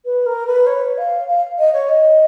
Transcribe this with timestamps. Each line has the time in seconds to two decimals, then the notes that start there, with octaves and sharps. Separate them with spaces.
0.05 B4
0.26 A#4
0.47 B4
0.67 C#5
0.98 F5
1.28 F5
1.58 D#5
1.73 C#5
1.89 D#5